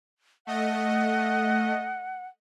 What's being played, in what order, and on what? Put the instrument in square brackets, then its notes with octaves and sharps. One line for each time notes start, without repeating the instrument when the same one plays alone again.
[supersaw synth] A3 D#5 [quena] F#5